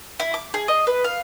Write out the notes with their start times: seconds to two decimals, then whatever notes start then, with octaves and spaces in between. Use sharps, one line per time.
0.20 E4
0.34 D6
0.54 G#4
0.68 D#5
0.87 B4
1.04 F5